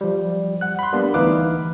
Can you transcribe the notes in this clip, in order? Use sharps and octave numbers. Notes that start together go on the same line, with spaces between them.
F3 G3
F#5 F#6
B5 C6
G3 A#3 B3 D4
D2 E3 D#4 B4 F5 D6